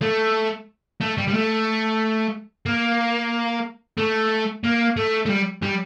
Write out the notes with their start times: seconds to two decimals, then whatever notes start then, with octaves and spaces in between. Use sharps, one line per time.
0.02 A3
1.01 A3
1.18 G3
1.28 G3
1.34 A3
2.66 A#3
3.98 A3
4.64 A#3
4.97 A3
5.26 A3
5.29 G3
5.62 G3